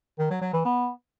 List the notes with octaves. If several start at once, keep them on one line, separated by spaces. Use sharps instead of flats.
D#3
F#3
F#3
E3
B3